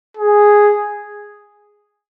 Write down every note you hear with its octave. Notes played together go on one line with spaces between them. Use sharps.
G#4